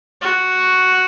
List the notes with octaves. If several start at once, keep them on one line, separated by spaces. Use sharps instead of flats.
F#4